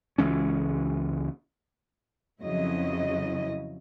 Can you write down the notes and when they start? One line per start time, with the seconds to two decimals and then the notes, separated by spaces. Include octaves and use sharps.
0.18 C#2 E3 G#3 C#4
2.41 F2 C#3 F#3 E4 D#5